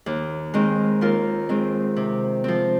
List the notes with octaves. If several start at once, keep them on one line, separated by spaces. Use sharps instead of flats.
D#2
D#3 G#3 C4
D#2 F4 A#4
D#3 G#3 C4
C3
F3 C4